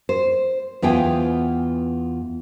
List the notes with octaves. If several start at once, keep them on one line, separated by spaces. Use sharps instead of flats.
C5
E2 B3 F4 G5 G#5